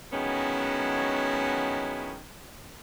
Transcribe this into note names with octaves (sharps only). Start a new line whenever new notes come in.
D#3 F#3 G#3 B3 C#4 E4